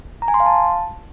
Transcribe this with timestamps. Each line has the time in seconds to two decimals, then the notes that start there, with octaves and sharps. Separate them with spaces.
0.22 A#5
0.28 G#5
0.34 C6
0.40 F5
0.46 A5